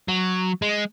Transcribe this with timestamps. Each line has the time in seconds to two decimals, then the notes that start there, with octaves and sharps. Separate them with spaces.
0.08 F#3
0.62 G#3